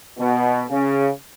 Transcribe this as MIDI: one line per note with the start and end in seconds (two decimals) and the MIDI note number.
0.18 0.63 47
0.69 1.09 49